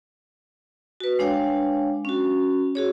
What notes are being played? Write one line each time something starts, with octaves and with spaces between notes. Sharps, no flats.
F#4 B4
G#3 D4 C#5 F5 G5
C#4 F#4
F#4 G#4 C#5